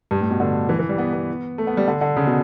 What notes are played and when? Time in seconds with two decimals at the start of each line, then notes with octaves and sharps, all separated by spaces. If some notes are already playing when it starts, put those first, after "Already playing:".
0.11 G2
0.21 A2
0.31 B2
0.40 D3
0.69 E3
0.79 E3
0.89 G3
0.98 B3
1.13 B3
1.58 A3
1.67 B3
1.77 G3
1.88 D3
2.01 D3
2.17 C#3
2.27 B2